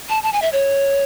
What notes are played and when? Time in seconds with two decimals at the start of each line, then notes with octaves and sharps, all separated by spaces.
0.09 A5
0.23 A5
0.33 G#5
0.42 E5
0.53 C#5